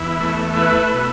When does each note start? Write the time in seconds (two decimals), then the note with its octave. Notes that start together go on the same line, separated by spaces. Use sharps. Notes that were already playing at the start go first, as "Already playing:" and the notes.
Already playing: E2 E4
0.21 A3
0.56 E4 B4
0.94 B2